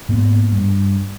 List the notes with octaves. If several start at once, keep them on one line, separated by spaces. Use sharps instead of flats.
G#2 A#3 B3
G2